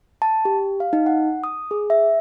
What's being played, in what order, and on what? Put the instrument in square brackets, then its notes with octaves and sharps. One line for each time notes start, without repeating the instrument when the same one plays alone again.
[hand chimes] A5
G4
F5
D#4
F#5
D#6
G#4
E5